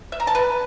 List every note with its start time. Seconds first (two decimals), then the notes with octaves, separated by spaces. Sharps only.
0.12 E5
0.20 A#5
0.27 A5
0.35 B4